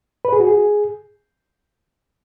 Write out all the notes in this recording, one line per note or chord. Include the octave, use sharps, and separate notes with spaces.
B4
G#4
F#4
G#4